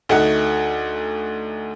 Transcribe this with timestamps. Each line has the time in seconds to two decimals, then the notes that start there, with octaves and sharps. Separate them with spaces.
0.09 D2 A3 D#4 F#5